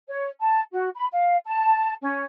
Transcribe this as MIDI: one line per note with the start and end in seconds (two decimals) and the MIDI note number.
0.08 0.28 73
0.40 0.62 81
0.72 0.89 66
0.95 1.06 83
1.13 1.36 77
1.46 1.93 81
2.02 2.23 61